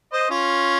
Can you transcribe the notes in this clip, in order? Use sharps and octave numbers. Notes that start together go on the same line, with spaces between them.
C5 D#5
C#4 F4